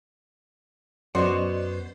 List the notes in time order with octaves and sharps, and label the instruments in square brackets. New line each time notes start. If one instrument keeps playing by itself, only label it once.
[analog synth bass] F#2 [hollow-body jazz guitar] B3 F#4 F#5 [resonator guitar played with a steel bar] C5 [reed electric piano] D5 D#5